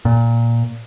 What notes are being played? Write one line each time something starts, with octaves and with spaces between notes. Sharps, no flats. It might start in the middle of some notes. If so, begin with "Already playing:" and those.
A#2